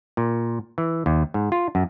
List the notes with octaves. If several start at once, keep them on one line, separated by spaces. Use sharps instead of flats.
A#2
E3
D#2
G#2
F4
F#2